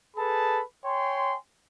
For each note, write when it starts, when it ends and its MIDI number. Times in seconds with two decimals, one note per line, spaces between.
0.17 0.62 68
0.17 0.62 69
0.17 0.62 71
0.17 0.62 81
0.17 0.62 83
0.85 1.37 73
0.85 1.37 79
0.85 1.37 80
0.85 1.37 84